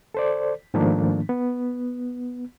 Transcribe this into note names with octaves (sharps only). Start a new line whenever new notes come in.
A4 C5 D5
G#2 D#3 F3 A3 A#3 D4
B3